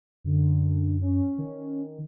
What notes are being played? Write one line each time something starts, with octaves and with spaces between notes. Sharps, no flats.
F#2 D3
C#4
D#3